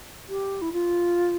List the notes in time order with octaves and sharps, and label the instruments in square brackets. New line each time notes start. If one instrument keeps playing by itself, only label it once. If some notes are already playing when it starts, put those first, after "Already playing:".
[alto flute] G4
E4
F4